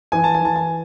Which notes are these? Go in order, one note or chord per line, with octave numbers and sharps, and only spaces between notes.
E3 G#5
A5
G#5
E3 A5
G#5